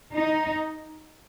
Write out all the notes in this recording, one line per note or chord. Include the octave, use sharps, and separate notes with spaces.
D#4